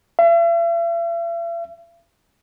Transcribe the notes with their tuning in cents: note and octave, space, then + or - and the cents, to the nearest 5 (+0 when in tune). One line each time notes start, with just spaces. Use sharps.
E5 +45